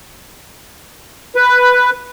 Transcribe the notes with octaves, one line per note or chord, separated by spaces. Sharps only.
B4